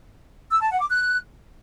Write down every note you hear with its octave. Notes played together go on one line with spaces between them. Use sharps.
E6
A5
F#5
D6
F#6